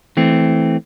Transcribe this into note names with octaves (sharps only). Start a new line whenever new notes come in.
E3 A3 C4